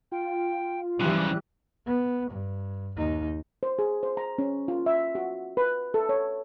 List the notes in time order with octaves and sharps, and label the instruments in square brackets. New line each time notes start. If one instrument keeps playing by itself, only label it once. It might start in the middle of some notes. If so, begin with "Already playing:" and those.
[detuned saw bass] F4 [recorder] G5
[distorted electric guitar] C#3 F3 [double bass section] E3 G3 [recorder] F#6
[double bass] B3
G2
D#2 D#4
[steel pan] C5
G#4
C5
A#5
C#4
F4
E5
F#4
B4
A4
C#5